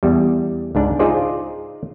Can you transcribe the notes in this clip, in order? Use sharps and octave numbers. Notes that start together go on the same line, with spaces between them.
E2 G3
C#2 G#2 D4
D#4 F4 G#4 C5 D5